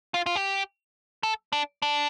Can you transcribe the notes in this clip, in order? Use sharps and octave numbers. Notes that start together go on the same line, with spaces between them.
F4
F4
G4
A4
D4
D4